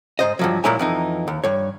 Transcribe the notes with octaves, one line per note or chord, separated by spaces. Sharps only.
G#2 C5 D#5
G2 F3 F#3
A#2 G#3 A#3 E4 C#5 G#5
F2 E3 D#4
D#2
G2 C#5